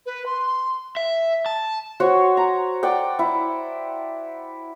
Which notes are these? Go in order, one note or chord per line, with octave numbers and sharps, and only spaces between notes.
B4
C6
C6
E5
A5
F#4 C5 C#5
A#5
D5 F#5 G5
E4